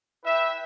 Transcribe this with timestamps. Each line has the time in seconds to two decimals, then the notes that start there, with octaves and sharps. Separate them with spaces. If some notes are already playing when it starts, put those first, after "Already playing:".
0.23 E4 B4 E5 G5